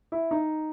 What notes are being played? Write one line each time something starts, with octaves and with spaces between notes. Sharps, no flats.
E4
D#4